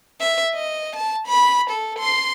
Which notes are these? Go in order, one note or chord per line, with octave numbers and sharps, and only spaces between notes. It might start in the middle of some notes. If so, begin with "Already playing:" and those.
E5
D#5
A5
B5
A4
C6 C7